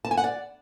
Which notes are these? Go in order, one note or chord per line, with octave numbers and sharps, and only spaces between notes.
A5
G#5
F#5
D5